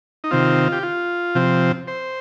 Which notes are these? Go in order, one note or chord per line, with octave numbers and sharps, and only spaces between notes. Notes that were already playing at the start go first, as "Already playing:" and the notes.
D#4
C3 D#3 C4 F4
G4
F4
C3 F3 C4
C5